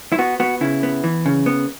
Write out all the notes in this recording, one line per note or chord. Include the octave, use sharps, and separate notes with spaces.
E4
B3 F#4
B3 F#4
C#3 E4
B3
E3
C#3
B3